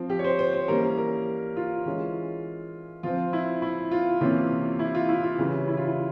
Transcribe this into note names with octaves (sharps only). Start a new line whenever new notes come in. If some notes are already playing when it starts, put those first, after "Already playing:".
Already playing: F3 C4
G4
C#5
C5
C5
C5
E3 G3 A#3 C#4 A#4
A#4
F4
E3 G#3 C#4
F3 C4 F4
E4
E4
F4
C3 E3 A#3 C#4 F4
E4
F4
E4
F4
C#3 E3 G3 C#4
E4
F4
E4